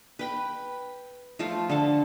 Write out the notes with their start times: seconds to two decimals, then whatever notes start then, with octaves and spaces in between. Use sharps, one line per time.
0.19 B4 G5 B5
1.39 F3 A3 F4
1.69 D3 A4 A5